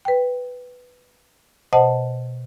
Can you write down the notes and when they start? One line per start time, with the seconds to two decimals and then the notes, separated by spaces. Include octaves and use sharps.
0.05 B4 G5
1.73 B2 C5 D#5 F#5 A5